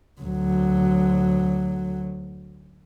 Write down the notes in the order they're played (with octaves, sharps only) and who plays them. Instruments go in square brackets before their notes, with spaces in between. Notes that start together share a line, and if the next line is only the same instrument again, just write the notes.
[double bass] D2 F#3